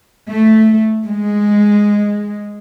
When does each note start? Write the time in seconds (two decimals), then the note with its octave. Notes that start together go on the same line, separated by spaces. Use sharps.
0.29 A3
1.05 G#3